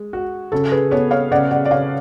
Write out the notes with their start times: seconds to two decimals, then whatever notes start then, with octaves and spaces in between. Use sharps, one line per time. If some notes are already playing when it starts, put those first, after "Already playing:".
Already playing: G#3
0.13 F#4
0.52 C#3 A4
0.72 G#4 B4
0.91 B3 A4 C#5
1.11 C#5 F5
1.31 C#3 D5 F#5
1.51 D5 F#5
1.65 D5
1.71 C#3 C#5 F5